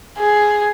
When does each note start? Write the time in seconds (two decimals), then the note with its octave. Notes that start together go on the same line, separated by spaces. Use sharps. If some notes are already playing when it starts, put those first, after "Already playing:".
0.18 G#4